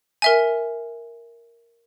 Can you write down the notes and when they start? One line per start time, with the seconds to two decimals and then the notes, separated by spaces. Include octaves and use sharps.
0.22 A#4 E5 G#5